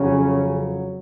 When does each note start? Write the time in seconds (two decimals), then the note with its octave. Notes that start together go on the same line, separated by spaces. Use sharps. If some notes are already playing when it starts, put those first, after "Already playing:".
Already playing: F2 C#3 F#3 C#4